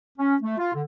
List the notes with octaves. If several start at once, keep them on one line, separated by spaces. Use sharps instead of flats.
C#4
A3
F4
D3